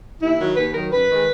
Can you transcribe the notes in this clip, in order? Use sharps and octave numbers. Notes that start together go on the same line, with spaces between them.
D#2 E4
D#3 F#3
D#2 B4
D#3 F#3 A#4
F#2 B4
D#3 G#3